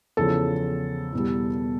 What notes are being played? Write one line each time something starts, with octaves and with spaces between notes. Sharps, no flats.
E2 C#3 F3 A4
E2 B2 G3